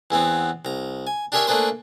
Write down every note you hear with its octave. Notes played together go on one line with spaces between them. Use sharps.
E2 E3 B3 C4
C2 A#5
G#5
D4 G4 G#4 A#4 C#5 E5
A3 A#3 D4 G#4 B4 C5